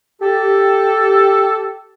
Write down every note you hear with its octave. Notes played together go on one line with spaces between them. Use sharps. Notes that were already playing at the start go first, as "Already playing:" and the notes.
G4 A4